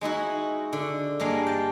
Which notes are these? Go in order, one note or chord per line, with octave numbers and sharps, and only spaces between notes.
G#3 D#4 E4 F#4
D3
G2 G#3 A#3 F5
G5 A5